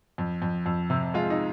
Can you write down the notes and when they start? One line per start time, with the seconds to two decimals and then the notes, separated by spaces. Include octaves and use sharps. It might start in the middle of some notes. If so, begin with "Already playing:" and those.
0.18 F2
0.42 F2
0.66 F2
0.90 C3
1.14 G#3 F4
1.30 D#4